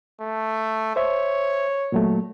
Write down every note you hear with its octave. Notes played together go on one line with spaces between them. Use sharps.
A3
C5 C#5 E5
A#2 F#3 A3